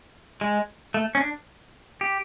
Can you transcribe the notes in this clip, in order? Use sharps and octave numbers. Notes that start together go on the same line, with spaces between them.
G#3
A3
C#4
D4
G4